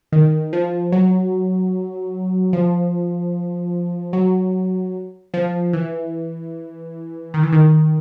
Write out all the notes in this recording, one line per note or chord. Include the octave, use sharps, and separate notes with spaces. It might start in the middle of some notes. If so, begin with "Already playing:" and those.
D#3
F3
F#3
F3
F#3
F3
E3
D#3
E3
D#3